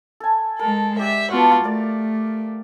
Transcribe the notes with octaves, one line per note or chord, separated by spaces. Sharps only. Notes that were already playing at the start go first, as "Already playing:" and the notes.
A4 G#5
G#3 A4 A#4
G4 D5 E5 F#5
B3 F4 F#4 F5 A5 D6
A3 A#4 D5